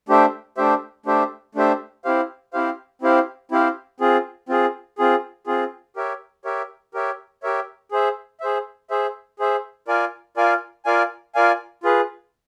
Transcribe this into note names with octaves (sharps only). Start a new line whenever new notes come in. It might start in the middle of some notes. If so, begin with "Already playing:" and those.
A3 D4 G4 C5 E5
A3 D4 G4 C5 E5
A3 D4 G4 C5 E5
A3 D4 G4 C5 E5
C4 E4 G4 C5 F5
C4 E4 G4 C5 F5
C4 E4 G4 C5 F5
C4 E4 G4 C5 F5
C4 F4 G#4
C4 F4 G#4
C4 F4 G#4
C4 F4 G#4
G4 A#4 C#5 E5
G4 A#4 C#5 E5
G4 A#4 C#5 E5
G4 A#4 C#5 E5
G#4 C5 E5
G#4 C5 E5
G#4 C5 E5
G#4 C5 E5
F4 A#4 D5 F5 G#5
F4 A#4 D5 F5 G#5
F4 A#4 D5 F5 G#5
F4 A#4 D5 F5 G#5
F4 G#4 B4